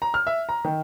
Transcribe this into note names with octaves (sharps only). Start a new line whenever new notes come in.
A#5
F6
E5
A#5
D#3